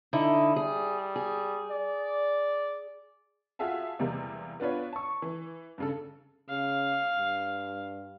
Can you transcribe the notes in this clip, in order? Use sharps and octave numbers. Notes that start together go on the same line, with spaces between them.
D3 D#4 E4
G3 G#4
G#4
D5
F4 F#4 G#4 E5 F5 A5
E2 C3 G3 G#3 A#3
B3 D4 F4 B4 C#5
A5 C#6
E3
G2 C#3 A4
C#3 F5
G2